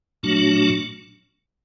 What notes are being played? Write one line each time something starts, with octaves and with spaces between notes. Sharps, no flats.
A#2 F#3 A3 D4 F#4